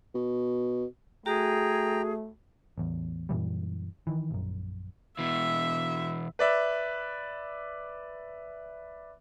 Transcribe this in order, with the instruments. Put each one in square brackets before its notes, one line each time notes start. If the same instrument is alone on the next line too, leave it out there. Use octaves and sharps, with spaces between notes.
[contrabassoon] B2
[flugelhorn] A3 [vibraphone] F#4 [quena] G#4 [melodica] G5 A#5
[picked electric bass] A1 E2
F#2 A#2 E3 G3
D#3 E3
A#1 F#2
[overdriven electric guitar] B2 E3 [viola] E5
[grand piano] B4 D5 E5